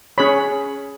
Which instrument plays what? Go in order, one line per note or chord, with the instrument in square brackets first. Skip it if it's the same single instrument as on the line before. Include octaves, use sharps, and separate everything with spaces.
[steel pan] C#4 G#4 C#5 B5